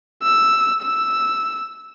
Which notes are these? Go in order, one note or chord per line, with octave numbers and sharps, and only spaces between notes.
E6
E6